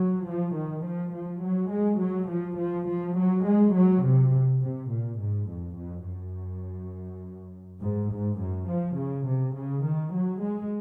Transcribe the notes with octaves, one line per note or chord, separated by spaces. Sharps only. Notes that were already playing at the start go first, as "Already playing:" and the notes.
Already playing: F#3
F3
D#3
F3
F3
F#3
G#3
F#3
F3
F3
F3
F#3
G#3
F#3
C3
C3
A#2
G#2
F2
F2
F#2
G#2
G#2
F#2
F3
C#3
C3
C#3
D#3
F#3
G#3